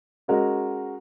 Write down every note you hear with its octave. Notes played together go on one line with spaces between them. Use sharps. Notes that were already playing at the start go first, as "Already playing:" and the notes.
G#3 C#4 F#4 A#4